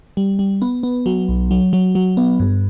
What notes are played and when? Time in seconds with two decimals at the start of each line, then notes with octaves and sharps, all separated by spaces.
0.17 G3
0.39 G3
0.62 B3
0.83 B3
1.06 F#3
1.29 B1
1.51 F#3
1.73 F#3
1.95 F#3
2.17 B3
2.40 G2